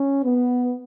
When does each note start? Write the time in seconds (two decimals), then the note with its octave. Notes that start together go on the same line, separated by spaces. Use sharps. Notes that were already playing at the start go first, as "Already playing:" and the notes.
Already playing: C#4
0.24 B3